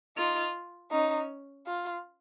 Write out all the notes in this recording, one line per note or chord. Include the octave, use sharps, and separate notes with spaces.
D#4 F4
C#4 D#4
F4